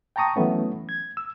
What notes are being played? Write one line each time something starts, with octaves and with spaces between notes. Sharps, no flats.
G5 A5 A#5 C#6 D#6
E3 F#3 A3 B3 C#4
G#6
E6